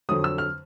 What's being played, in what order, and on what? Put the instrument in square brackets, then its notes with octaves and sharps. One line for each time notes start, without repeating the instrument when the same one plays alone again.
[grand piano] F2 D3 F#3 D#6
E6
F6